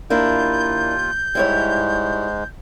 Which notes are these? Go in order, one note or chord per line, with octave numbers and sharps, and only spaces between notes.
D#2 A#3 D4 E4 F4 G6
G#2 G3 G#3 E4 C#5